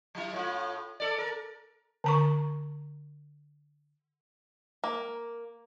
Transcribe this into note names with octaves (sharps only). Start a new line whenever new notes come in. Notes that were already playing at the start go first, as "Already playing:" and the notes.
F#3 E4
A2 F4
A4 D5
A#4
D3 A#5 C#6
A#3